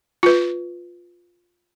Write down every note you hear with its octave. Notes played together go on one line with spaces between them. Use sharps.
F4 B4